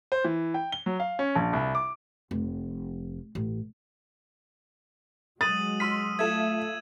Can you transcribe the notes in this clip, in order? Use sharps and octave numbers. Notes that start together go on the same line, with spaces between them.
C5
E3
G5
G7
F#3
F5
C#4
A#1
C2
D6
F1
A1
F#3 G#3 D#6 A6 D#7 F#7
C6 E6 F6 B6 D#7
A3 F4 A4 E5 G#6 E7